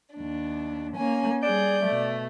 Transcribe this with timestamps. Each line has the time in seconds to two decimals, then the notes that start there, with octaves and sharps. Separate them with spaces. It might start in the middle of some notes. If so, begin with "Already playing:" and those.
0.15 D#2 D4
0.96 A#3 C#4 G#5
1.43 G3 G#4 D5 G6
1.84 B2 A3